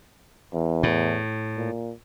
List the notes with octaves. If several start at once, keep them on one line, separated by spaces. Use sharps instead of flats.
E2
A2
A#2